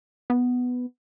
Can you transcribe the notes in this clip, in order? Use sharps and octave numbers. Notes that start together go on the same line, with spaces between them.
B3